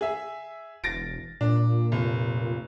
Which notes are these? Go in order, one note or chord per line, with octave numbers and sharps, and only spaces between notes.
G#4 E5
E1 A6 A#6 D7
A#2 D4
F1